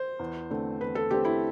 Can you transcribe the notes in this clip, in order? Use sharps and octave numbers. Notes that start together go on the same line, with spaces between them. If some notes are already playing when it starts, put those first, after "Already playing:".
Already playing: C5
E2
D3 A3 C4
E2 B4
A4
D3 A3 C4 G4
E4